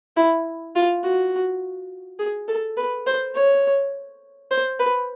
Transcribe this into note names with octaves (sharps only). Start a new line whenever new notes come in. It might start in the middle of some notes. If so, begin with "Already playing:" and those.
E4
F4
F#4
G#4
A4
B4
C5
C#5
C5
B4